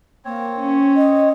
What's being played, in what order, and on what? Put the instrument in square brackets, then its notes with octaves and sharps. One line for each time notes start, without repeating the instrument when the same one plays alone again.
[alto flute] A#3 [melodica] C4 C#5
[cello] C#4
[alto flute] D#5